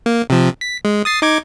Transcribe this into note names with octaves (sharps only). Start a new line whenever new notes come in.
A#3
C3 F3
B6
G#3
D#6 A6 C7
D#4 D6 G#6